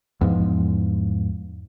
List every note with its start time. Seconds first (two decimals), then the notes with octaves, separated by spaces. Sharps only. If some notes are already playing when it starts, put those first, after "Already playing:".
0.21 E2 G#2 F3